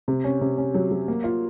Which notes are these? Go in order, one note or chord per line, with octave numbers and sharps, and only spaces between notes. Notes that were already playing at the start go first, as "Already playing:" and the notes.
C3
C#4
C3
C#4
F#3
F#3
A#3
F4